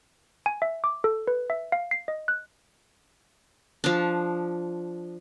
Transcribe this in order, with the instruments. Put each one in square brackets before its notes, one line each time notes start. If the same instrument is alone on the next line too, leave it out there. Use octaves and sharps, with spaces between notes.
[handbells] G#5
E5
D6
A4
B4
E5
F5
C7
D#5
F#6
[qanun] F3 D4